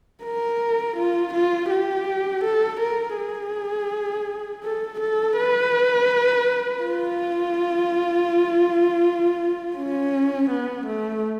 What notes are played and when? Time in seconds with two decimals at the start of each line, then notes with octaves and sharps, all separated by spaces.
0.24 A#4
0.97 F4
1.34 F4
1.71 G4
2.44 A4
2.80 A#4
3.17 G#4
4.64 A4
5.00 A4
5.37 B4
6.83 F4
9.77 C#4
10.51 B3
10.87 A3